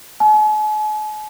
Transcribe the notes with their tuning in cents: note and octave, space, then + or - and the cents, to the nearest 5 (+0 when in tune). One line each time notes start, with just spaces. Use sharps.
G#5 +45